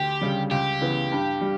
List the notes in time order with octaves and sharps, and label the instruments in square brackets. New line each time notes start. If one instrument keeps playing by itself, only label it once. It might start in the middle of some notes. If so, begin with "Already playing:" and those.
Already playing: [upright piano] D2 [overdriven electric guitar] G4
[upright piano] C#3 G3
[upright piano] C#2 [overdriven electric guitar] G4
[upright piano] C#3 E3 B3
G2
G3